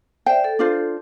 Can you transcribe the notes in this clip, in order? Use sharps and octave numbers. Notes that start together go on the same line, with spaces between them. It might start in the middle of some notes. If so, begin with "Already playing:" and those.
C5 D5 E5 G5
A4
D4 F4 C5